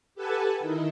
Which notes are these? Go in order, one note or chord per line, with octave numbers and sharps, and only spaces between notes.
G4 A4 B4 F#5 G#5 A5
D#3 D#4 E4